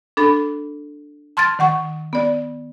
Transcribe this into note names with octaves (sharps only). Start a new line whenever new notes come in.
D4 A4 B5
A5 C6 F6 G#6 A6
D#3 F#5 C#6
B3 D5